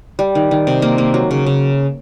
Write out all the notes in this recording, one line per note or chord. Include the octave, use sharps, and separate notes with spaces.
G3
D#3
D#3
C3
A#3
A#3
F#3
C#3
C#3